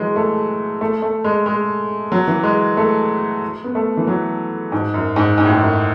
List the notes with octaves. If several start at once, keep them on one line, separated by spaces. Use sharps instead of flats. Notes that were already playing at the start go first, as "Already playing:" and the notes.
Already playing: E3 F#3 G#3
A3
A3
A3
G#3
G#3
F#3
E3
G#3
A3
B3
A3
E3
F#3
G#2
F#2
G#2
G#2
A2
G#2
F#2